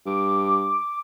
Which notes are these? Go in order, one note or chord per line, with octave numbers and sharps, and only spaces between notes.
G2 D6